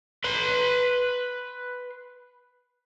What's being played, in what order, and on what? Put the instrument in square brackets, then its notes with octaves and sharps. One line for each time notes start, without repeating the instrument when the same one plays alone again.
[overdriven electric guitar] B4 C6